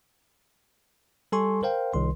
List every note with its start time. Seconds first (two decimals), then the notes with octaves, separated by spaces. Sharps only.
1.32 G3 A4 G#5 C6 C#6
1.63 A#4 C5 F5 G5
1.94 C2 D#3 C6